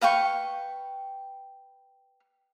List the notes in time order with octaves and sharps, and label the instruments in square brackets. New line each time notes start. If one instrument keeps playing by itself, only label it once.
[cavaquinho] B4 F5 G5 C#6